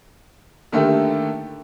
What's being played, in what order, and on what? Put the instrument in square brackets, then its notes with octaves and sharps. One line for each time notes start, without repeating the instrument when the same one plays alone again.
[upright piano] D3 D#3 A3 A#3 G4 A4